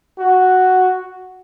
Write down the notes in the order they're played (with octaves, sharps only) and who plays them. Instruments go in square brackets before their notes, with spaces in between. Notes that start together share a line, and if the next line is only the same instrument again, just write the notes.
[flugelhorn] F#4